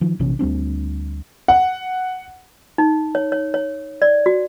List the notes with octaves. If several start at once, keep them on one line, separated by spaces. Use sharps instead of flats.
D#3 F3
A#1 C3 E3 C#4
D2 G3 C4 D4
F#5
D#4
C#5
C#5
C#5
D5
F#4